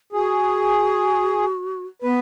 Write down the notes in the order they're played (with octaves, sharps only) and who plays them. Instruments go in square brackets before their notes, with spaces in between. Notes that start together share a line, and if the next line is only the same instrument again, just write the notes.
[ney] F#4 [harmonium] G#4
[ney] B3 [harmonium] B4